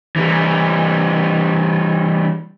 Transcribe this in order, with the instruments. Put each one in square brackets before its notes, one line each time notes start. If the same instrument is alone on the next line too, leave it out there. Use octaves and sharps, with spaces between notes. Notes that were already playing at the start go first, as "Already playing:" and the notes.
[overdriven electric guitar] E3 G3